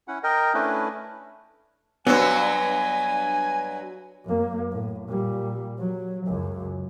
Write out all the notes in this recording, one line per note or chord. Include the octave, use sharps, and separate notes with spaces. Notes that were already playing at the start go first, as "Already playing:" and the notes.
C#4 E4 F#5
A#4 D#5 G5
A3 C#4 D4 E4 B4
G2 F#3 B3 C5 G#5
F#2 A#3
A2
A#2 G3
F#3
C#2 F#2